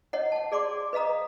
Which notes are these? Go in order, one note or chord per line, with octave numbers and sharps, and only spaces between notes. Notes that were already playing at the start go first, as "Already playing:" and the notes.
C#5 D#5 F#5
F#5 A5
G#4 D5 C6 D6
B4 D#5 F5 A#5 D#6